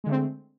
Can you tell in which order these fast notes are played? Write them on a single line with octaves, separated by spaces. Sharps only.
G#3 D3 A3 C4